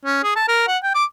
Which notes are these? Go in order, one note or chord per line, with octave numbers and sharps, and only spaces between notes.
C#4
G#4
A5
A#4
F#5
G5
D6